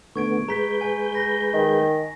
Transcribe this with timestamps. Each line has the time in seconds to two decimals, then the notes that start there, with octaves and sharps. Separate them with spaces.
0.16 D3 A3 B3 C#6 G#6 D7
0.48 G#3 B4 A#5 G6 B6
0.81 G#5
1.15 A#6
1.54 D#3